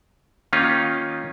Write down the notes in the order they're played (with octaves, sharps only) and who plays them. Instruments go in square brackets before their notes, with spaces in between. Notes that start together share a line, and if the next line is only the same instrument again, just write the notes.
[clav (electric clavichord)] D#3 A#3 C#4 D#4 F4